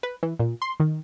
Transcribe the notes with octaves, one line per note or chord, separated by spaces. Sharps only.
B4
E3
A#2
C6
D#3